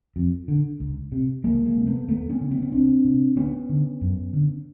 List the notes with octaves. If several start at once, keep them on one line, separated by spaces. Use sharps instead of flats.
F2
D3
C#2
C3
C#2 G#3 A#3
G#3 A#3
C3
A3 B3
D#2 A3 B3
B3 C#4
C#3
B3 C#4
C#4
C2 C4 D4
C3
D2 B3 C#4
D3
F#2
D3